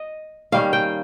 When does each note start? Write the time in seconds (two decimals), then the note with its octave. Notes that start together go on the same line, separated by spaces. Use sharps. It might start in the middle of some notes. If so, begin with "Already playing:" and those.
Already playing: D#5
0.52 D#3 G3 A#3 C#4 F5
0.73 G5